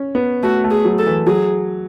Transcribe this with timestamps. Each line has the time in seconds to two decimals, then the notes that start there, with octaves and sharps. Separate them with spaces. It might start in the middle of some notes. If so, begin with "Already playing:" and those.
Already playing: C#4
0.15 B3
0.43 A3 F#4
0.64 A3
0.71 G#4
0.85 F#3
0.99 A4
1.06 E3
1.27 F#3 G#4